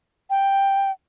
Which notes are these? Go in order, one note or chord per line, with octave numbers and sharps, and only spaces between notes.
G5